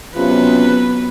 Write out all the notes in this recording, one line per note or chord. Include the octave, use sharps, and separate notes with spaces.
C3 F#3 B3 C#4 F4 B4